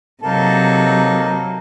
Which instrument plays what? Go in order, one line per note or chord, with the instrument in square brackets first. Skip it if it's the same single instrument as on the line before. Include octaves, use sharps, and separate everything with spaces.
[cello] C3 F#3 [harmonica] A#3 D#4 A4